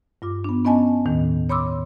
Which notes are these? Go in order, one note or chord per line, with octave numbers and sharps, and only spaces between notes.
G2 F4 D6
B3 D4
B3 C#4 D#5 G#5 A5
D#2 A2 D#3
C#5 B5 C6 D6 E6